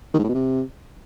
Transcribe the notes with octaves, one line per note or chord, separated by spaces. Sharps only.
D#3
G#2
A2
B2
C3